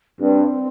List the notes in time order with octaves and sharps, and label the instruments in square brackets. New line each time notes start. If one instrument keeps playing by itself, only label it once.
[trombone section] G2 [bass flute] C4